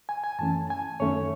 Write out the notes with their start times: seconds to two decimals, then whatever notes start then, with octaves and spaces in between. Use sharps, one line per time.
0.09 G#5
0.24 G#5
0.39 F#2 E3 A3 C#4 A5
0.70 G#5
1.00 F#2 D#3 A3 C#4 C#5